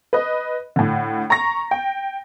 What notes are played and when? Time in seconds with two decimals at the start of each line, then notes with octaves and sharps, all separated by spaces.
0.13 B4 D#5
0.76 A2 D3
1.30 A#5 C#6 A#6
1.71 G5